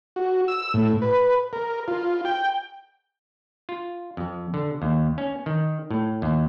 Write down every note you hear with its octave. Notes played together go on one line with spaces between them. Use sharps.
F#4
E6
A2
B4
A#4
F4
G5
F4
F2
D3
D#2
C#4
D#3
A2
D#2